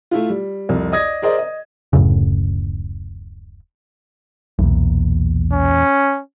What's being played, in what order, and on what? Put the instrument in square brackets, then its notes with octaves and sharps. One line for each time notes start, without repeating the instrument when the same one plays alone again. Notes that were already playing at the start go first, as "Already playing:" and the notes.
[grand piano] A3 E4 F4
G3
C2 F2
D5 D#5 D#6 G#6 A#6
G#4 A#4 C5 D5 D#5
D#5
[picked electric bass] D1 F#2 A2 C#3
[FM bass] B1 [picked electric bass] E2 A#2
[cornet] C#4